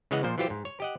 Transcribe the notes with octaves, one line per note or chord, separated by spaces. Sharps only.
C#3 E3 G#3 C#5 D#5 F#5
A#2 F3 C5
E3 F#3 F4 G4 C5
G#2
C#5
G4 D#5 F#5